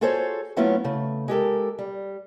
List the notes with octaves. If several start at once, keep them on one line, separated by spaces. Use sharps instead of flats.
F4 F#4 G#4 A4 C5 C#5
F#3 A3 B3 C#4 E4 F4
C#3 A3
G#3 G4 A4 A#4
G3